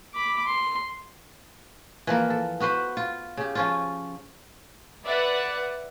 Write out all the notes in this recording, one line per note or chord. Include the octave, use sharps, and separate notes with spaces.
B5 D6
C6
E3 F3 A#3 A#4
A4
B3 F#4 B4 C5
F4
C#3 G4
F3 C#4 F4
B4 D5 E5 F#5